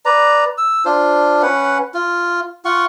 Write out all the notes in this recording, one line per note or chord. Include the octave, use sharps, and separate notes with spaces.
B4 D5 A#5
E6
D4 F4 C5
C#4 B4 F#5
F4
F4 F#5 C#6